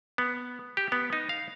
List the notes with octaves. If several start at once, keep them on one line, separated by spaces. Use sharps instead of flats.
B3
G4
B3
D#4
F5